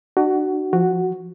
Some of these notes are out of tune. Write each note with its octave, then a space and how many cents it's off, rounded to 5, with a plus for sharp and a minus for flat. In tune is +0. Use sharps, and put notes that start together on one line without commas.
D4 +40 F#4 +15
F3 +0 F#4 +0